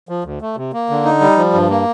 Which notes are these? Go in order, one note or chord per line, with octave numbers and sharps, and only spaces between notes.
F3
D2
A3
C3
A#3
D3
D#4
G3
F3
G2
A#3